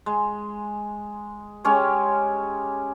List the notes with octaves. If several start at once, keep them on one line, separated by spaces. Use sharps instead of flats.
G#3
G#3 C#4 G4 C#5